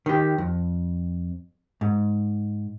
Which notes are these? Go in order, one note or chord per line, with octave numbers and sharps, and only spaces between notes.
D#3 G4
F2
G#2